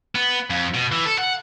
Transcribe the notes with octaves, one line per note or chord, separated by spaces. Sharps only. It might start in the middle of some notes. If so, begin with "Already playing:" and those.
B3
F2
B2
E3
A4
F#5